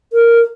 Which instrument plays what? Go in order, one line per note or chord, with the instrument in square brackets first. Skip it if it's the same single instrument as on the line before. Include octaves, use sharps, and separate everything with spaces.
[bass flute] A#4